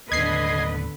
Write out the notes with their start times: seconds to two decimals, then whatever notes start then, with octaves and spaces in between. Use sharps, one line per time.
0.12 D#2 A2 D3 B3 B4 D#5 G#6 C7